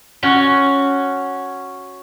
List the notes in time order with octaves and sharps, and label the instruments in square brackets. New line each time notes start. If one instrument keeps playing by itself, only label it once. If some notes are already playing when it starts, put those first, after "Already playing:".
[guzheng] C#4 F#4